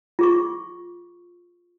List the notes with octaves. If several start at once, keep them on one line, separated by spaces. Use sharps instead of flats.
F4 G#4 C#6